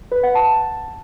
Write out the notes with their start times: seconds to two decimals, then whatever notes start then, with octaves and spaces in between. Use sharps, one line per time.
0.12 B4
0.23 F#5
0.35 A5